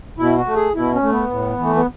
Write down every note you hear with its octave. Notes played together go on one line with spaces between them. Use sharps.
B2 E4
F#4
A3
G#4
B2 E4
C#4
A3
B3
A2
E3 A3
B3